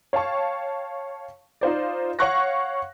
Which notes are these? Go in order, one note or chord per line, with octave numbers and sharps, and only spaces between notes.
C#5 F5 G5 A5 C#6
D#4 F4 C5 D5
C#5 F5 F#5 C#6 F#6 A#6